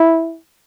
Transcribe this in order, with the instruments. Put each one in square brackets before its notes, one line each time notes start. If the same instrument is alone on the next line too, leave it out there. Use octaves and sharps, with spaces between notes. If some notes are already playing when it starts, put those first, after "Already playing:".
Already playing: [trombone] E4